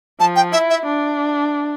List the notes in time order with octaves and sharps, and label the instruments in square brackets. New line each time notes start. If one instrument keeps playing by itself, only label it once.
[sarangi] F3 [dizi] A5
[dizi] G5
[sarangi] E4 [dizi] E5
[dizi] E5
[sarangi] D4